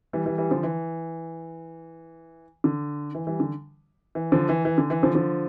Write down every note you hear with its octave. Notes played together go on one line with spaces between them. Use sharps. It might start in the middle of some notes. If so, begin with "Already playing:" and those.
E3 G3
E3 G3
E3 G3
D3 F3
E3
D3
E3
E3 G3
D3
E3
D3 F3
E3
E3
D3
E3
D3 F3
D3 F3